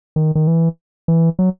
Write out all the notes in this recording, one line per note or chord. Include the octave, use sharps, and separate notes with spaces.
D#3
D#3
E3
E3
F#3